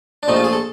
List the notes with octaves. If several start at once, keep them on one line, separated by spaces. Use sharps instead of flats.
D4
A#1 A#2 F3 A3 D#4
F4
G#4
A4